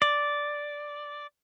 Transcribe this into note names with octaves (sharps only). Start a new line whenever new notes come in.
D5